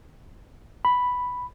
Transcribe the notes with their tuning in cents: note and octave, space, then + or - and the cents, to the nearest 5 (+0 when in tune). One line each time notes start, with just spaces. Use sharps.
B5 +0